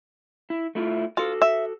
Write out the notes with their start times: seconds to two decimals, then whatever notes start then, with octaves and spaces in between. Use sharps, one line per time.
0.50 E4
0.75 A3 E4 F4
1.17 F4 F#4 A4
1.42 E5